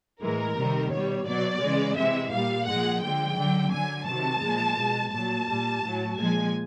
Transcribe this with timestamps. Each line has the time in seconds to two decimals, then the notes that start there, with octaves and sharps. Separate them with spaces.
0.21 A2 E3 G#3 A#4
0.56 C3 D#3 G3
0.91 B2 G3 C#5
1.27 B2 F#3 D5
1.62 C#3 E3 G#3
1.97 C3 E3 G#3 E5
2.31 A#2 G3 F5
2.67 A#2 F3 G#3 F#5
3.02 D3 F3 G#3 G5
3.37 D3 F#3
3.71 D3 F#3 G#5
4.07 C3 D#3 F#3 A5
4.42 A#2 F3 G#3
4.77 B2 G#3
5.12 A#2 F#3 A5
5.48 A#2 G3
5.83 A2 F#3
6.18 A#2 F3 G#3 G#5